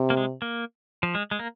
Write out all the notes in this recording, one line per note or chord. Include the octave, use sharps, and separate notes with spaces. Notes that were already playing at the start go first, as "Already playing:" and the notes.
Already playing: C3
A#3
G#3
A#3
F3
G#3
G#3
A#3